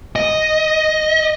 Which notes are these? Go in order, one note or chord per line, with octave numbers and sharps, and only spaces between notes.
D#5